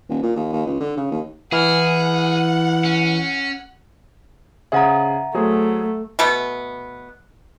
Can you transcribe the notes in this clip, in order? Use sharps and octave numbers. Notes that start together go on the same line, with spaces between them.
D#1
A#2
D#2
D#2
C#2
D3
C#3
D#2
E3 E4 G#4 F#5 F6
C#4
C#3 G#4 C5 E5 F#5 A#5
F#3 A3 G#4 C5
B2 A3 B3